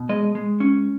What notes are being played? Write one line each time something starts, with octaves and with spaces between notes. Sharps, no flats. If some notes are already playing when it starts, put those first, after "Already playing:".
Already playing: B2
G#3 D#5
G#3
C#4